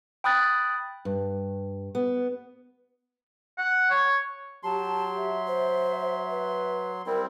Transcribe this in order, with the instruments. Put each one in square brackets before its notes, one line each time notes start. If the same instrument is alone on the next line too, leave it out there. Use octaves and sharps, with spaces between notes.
[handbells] G5 B5 D#6 F#6 A6
[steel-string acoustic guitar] G2
B3
[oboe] F#5
C#5
[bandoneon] F#3 C6 [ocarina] G4 [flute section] A5
[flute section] E5
[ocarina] C5
B4
[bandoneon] G3 C4 E4 [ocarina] A#4